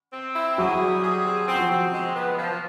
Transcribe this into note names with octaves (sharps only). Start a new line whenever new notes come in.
C4
E4
F#3 F#4 G#4
G3
G#4
C4
C4
F#4
F3 F4
C4
G#3
B3
F3